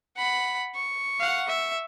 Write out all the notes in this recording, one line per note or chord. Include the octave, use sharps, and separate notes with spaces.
F#5 B5
C#6
F5 F#5
E5